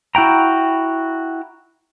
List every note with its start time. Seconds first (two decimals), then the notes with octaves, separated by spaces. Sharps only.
0.15 E4 F#4 G5 A#5